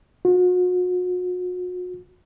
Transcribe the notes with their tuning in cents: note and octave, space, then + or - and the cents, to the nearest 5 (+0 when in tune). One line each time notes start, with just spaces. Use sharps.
F#4 -40